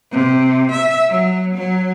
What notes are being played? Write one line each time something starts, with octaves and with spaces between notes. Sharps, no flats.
C3
E5
F#3
F#3